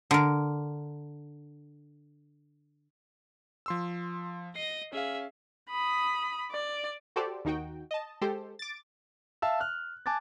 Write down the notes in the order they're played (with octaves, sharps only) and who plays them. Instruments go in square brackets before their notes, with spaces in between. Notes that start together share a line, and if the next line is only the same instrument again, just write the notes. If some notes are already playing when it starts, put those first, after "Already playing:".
[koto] D3 A#4
[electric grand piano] F3 C6 E6
[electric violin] D#5 A#6 [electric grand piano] C7
[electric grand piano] C#4 F5 [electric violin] G#4 E5
[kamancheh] B5 D#6
D5
[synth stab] F#4 G4 A4 C5 D5
D#2 D#3 D#4 F#4 G5
D#5 A5
G#3 G4 A4 C5
D6 A6
[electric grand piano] E5 F5 A5 E6
F6 F#6
G#5 A5 D6 F#6 A6